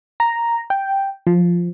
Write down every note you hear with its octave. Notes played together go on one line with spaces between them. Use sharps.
A#5
G5
F3